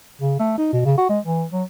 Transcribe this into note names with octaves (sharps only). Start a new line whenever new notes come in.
C#3
A3
D#4
B2
C#3
F#4
G#3
E3
F#3